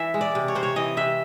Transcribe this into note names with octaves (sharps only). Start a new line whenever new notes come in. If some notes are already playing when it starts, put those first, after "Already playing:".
Already playing: E3 E5
G#3
D5
C3
C#5
C3 C5
C#5
E3 D#5
C3 E5